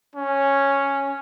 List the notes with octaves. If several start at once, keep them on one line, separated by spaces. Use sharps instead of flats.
C#4